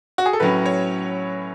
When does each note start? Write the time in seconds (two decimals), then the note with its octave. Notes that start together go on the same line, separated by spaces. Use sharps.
0.18 F#4
0.26 G#4
0.33 A4
0.40 A2 F#3 C#4 B4
0.66 C#5